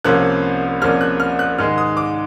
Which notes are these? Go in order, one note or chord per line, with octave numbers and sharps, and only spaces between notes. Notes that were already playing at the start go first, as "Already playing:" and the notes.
C2 C3 F3 A#3 C#4 F#6
C2 C3 F3 A#3 C#4 F6
F#6
F6
F#6
G#2 D#3 G#3 F6
D#6
D6